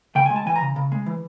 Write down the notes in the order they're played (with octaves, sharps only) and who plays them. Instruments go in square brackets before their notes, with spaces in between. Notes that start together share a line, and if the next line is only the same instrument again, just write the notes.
[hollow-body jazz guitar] C#3 G5
G#3 G#5
A5
E3 G#5
A#5
C#3
C#3
G#3
E3